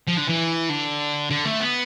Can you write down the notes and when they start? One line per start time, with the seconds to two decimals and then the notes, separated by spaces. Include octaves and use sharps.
0.08 F3
0.18 D3
0.29 E3
0.70 D3
1.30 D3
1.45 A3
1.60 B3